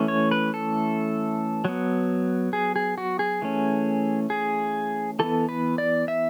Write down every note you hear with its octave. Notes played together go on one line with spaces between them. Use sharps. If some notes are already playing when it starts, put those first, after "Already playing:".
Already playing: E3 A3 C#4
C#5
B4
A4
F#3 B3
G#4
G#4
F#4
G#4
E3 A3 C#4
G#4
E3 B3 A4
B4
D5
E5